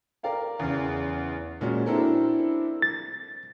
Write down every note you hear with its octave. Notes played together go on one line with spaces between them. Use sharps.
A#4 D5 F5 G5
E2 C#3
A#2 G#3 C#4 F#4
C4 D4 E4 A4 A#4 C5
A6